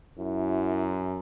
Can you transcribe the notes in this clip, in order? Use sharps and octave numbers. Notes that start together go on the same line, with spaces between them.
F#2 E4